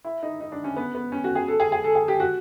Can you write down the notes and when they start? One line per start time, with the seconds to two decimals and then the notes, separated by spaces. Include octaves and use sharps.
0.04 E4
0.23 D#4
0.40 D#4
0.52 D4
0.64 C#4
0.76 B3
0.95 B3
1.12 C#4
1.24 F#4
1.35 G#4
1.48 A4
1.60 G#4
1.72 G#4
1.84 A4
1.95 G#4
2.08 G4
2.20 F#4